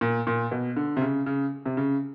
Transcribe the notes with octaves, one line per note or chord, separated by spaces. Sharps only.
A#2
A#2
B2
D3
C3
C#3
C#3
C3
C#3